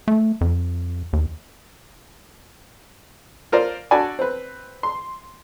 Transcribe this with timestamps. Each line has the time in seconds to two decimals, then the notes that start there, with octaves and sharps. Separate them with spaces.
0.08 A3
0.41 F2
1.13 D#2
3.52 F4 A#4 C5 D5
3.91 D4 F#4 A4 D5 G#5 B5
4.19 C4 B4
4.83 C6